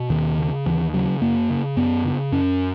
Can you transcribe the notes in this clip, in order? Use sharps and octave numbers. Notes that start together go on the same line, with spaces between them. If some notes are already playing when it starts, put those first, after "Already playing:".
Already playing: B2
D#2 D#3
C#3
D#2 E3
C#3 F#3
F#2 A#3
C#3
F#2 B3
C#3
F#2 C#4